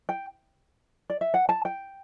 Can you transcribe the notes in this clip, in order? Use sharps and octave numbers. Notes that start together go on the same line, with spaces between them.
G5
D5
E5
F#5
A5
G5